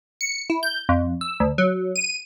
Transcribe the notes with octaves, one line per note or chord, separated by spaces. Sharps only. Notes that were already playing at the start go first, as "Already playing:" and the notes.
C#7
E4
G6
F2
E6
D2
F#3
D#7